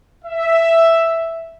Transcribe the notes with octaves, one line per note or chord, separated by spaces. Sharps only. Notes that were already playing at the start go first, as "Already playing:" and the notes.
E5